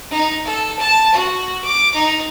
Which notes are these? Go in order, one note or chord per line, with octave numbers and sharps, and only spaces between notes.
D#4
A4
A5
F#4
D6
D#4